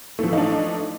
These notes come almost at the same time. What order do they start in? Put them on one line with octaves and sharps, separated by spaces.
A3 F3 E3 D#4 D4